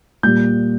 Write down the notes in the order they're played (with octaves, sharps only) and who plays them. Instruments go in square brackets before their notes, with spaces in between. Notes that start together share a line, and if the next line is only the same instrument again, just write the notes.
[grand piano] A#2 G3 A#3 G6